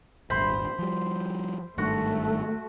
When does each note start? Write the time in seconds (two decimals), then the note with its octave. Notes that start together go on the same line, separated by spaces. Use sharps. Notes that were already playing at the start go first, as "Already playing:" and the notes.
0.30 D#1 G#1 G2 C5 B5
0.79 F3 G3
1.78 G#1 G2 D#3 A3 F#4